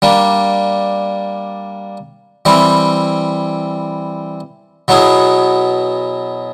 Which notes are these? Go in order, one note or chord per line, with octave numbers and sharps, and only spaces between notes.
G3 A#3 D4
E3 G3 C4 E4
B2 F#3 B3 E4 G#4